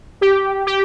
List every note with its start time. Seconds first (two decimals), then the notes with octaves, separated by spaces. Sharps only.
0.21 G4
0.67 G4